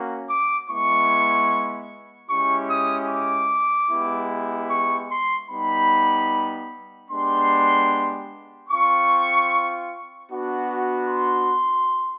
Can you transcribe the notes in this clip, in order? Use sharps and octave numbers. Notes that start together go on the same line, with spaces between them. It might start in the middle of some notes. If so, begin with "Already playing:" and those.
Already playing: A#3 C#4 F#4
D6
G#3 B3 E4 C#6
G#3 C#4 E4 G4 C#6
D#6
D6
G#3 B3 E4 G4
C#6
C6
G3 B3 D#4 G4 B5
G#3 B3 D4 G4 C6
C4 F4 C#6
B3 D4 F#4
C6